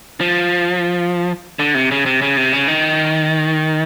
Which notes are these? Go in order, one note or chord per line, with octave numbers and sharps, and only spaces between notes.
F3
D3
C3
C#3
C3
C#3
C3
C#3
D#3